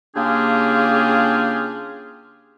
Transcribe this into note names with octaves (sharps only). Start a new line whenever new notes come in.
C#3 A#3 D4 F4 G4 G#4